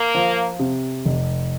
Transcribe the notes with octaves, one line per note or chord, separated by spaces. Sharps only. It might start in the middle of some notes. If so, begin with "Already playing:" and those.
Already playing: A#3
F3
C3
F1